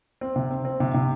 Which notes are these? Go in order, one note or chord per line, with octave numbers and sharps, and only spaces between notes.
C4
C3
C4
C4
C3
C3